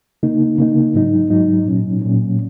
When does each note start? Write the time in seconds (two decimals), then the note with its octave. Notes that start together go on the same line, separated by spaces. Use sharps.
0.23 C#3 A#3 D#4
0.58 C#3 A#3 D#4
0.95 G#2 F#3 D#4
1.30 G#2 F#3 D#4
1.66 A#2 F#3 C#4
2.02 A#2 F#3 C#4